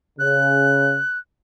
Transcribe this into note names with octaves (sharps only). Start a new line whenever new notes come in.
C#3 F#6